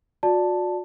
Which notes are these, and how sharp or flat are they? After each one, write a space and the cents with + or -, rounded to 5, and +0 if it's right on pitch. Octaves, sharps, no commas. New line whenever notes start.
F#4 -35 D5 +0 A5 +0